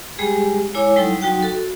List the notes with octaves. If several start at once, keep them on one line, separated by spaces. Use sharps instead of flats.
G3 G#3 G4 G#4
G#3 E4 C#5 D6
F#3 G3 D#4 E4 A4
F#3 D#4 F#4 G5
F#4 A4